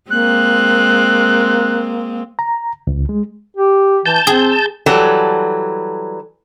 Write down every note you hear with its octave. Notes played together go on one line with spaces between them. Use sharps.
G#3 A#3 C4 F#6
A#5
C#2
G#3
G4
E3 A5 G6
C4 G#4
E3 F#3 G3 A4